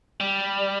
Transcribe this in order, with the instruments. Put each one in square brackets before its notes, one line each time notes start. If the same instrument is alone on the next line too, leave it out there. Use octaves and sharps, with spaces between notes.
[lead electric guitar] G3